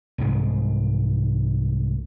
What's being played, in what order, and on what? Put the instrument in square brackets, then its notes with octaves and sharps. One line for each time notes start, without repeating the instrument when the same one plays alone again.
[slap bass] C2 G#2 G#3